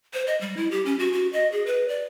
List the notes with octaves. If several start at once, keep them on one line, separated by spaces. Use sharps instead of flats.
C5
D#5
G3
E4
G4
C#4
F#4
F#4
D#5
G#4
B4
D5